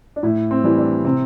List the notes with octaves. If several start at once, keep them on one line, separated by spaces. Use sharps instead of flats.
D4
A2 E4
C4
E3 G3
D4
C3 C4